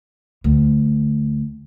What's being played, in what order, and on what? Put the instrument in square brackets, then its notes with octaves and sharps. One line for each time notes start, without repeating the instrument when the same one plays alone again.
[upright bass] D2